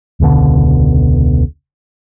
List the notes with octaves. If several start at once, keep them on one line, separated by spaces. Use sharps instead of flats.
E1 C#2 B2 D3